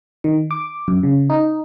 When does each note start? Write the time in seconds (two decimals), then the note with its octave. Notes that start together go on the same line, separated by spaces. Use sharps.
0.24 D#3
0.51 D6
0.88 F#2
1.03 C#3
1.30 D#4